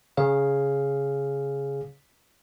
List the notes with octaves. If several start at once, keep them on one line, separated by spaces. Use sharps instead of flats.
C#3 G#4 C#5 F5